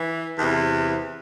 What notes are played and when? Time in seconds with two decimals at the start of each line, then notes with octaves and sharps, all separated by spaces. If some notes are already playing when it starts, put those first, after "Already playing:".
Already playing: E3
0.39 E2 C3 E3